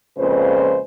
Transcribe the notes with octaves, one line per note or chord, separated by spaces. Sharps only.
F2 A#2 C#3 G#3 B4 C5